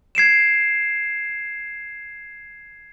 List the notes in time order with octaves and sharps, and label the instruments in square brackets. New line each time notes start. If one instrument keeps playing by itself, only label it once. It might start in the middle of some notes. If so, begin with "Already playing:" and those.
[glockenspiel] G#6 C7 D7 E7